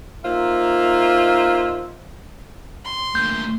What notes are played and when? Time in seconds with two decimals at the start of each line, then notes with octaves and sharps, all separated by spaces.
0.24 A#3 D#4 F4 C5 E5
2.85 C6
3.15 D2 A#2 G6